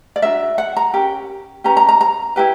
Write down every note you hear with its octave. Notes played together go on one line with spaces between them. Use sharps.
D5
D4 F#4 A#4 E5
F#5
A#5
C#4 G4 A#4
C#4 G4 B4 A#5
A#5
A#5
A#5
E4 G4 B4